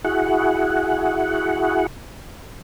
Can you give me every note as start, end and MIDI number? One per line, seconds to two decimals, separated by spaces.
0.05 1.87 64
0.05 1.87 66
0.05 1.87 68
0.05 1.87 78